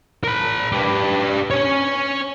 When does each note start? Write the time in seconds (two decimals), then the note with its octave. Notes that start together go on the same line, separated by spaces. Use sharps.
0.24 A#4 B5
0.72 G4 B4
1.51 C#5 G#5